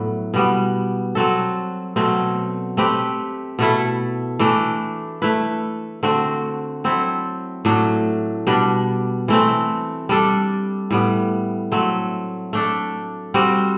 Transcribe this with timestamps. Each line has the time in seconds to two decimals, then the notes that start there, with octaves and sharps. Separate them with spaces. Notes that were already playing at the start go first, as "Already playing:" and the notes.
Already playing: A2 F#3 B3
0.34 B2 G3 B3
1.15 F#3 C4 F#4 A4
1.96 B2 F#3 A3 C4
2.77 A3 C4 G4 B4
3.59 B2 A3 E4 A4
4.39 E3 A3 D4
5.22 A3 E4 B4
6.03 D3 A3 C4 F#4
6.84 F#3 C4 E4 A4
7.65 A2 F#3 A3 D4
8.47 B2 G3 D4
9.28 E3 A3 C4
10.09 G3 D4 A4
10.91 A2 G3 B3
11.72 F#3 A3 C4
12.53 A3 D4 A4
13.34 G3 C4 F#4